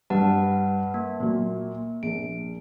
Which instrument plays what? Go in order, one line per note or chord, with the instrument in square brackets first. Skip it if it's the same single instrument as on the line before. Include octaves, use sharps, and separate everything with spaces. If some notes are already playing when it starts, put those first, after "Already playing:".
[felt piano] G2 [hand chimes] B4 F#5 A5
[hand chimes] A#3
[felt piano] A#2 F#3
[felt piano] A#1 [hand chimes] D7